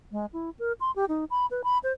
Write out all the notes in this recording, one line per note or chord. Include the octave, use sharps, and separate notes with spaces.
G#3
E4
A#4
C6
G4
D#4
B5
B4
B5
C5